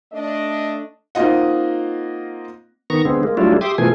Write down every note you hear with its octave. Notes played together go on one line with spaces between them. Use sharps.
A3 D4 D#5
A#3 C4 D#4 F4 D#5 F#5
D#3 B3 A#5 C#6
D3 G#3 B3 C4
G#3 A#3
F#3 G3 A3 D4 E4 F4
G4 E5 C6 D6 D#6
B2 E3 F3 A3 G#4 G#5